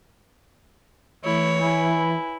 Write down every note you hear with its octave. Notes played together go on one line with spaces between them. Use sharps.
E3 A3 E4 C#5
E4 B4 G#5